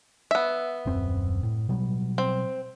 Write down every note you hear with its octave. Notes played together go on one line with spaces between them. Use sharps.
B3 E5
D#1 F#2 C4
A2
B2 F#3 G3
C4